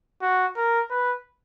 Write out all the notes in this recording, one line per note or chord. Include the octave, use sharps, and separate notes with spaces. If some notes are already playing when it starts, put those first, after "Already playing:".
F#4
A#4
B4